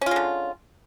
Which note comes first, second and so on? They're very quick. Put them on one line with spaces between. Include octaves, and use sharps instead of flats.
C#4 F4 G#3 D3